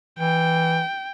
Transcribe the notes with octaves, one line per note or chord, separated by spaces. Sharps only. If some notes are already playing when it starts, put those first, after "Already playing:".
E3 G5